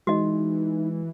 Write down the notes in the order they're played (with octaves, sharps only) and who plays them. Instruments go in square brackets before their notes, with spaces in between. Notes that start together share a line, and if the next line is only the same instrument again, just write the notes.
[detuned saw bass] E3 [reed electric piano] G#3 [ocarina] D#4 [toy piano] F#4 D#5